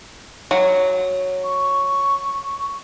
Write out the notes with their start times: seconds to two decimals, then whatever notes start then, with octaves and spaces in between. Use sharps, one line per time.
0.51 F#3
1.44 C#6